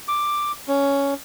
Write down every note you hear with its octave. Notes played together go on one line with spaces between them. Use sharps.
D6
C#4